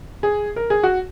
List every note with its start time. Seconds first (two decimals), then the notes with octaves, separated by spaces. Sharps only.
0.23 G#4
0.56 A#4
0.70 G#4
0.83 F#4